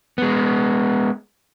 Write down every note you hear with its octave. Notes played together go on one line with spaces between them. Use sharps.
G#3 B3